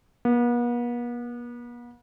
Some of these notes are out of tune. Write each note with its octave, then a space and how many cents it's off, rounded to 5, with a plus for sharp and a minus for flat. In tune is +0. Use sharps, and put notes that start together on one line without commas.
B3 -45